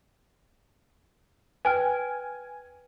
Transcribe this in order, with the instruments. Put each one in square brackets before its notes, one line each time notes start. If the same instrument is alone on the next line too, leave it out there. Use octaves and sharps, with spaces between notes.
[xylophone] B4 G5 F6 [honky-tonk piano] G#5